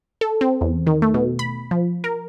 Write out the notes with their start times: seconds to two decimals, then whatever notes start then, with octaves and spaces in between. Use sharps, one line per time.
0.21 A4
0.41 C4
0.61 E2
0.87 D#3
1.02 A3
1.14 B2
1.39 B5
1.71 F3
2.04 A#4